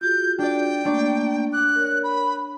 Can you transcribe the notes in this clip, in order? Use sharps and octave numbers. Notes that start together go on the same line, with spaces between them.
F4 F#4 G#4 G6
D4 D5 G5
A3 A#3 D4 D5 C#6
D6 F#6
A#4 C#5
B5